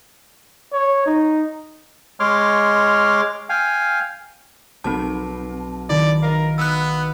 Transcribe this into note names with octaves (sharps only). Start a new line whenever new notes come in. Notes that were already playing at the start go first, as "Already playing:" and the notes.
C#5
D#4
G#3 C#5 C6 D6 F6
F5 G5 G#5
B1 C4 A5
D#3 E4 D5
A#4 D#5 F5
B3 E6 F#6